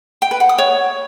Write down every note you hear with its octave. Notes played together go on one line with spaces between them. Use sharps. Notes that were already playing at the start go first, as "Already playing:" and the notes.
G5
B4
F#5
D#6
C#5